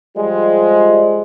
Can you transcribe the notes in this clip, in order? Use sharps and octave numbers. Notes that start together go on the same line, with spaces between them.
F3 G3 G#3